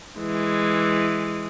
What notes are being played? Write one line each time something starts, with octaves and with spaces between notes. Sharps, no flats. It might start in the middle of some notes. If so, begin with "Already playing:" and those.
E3 G#3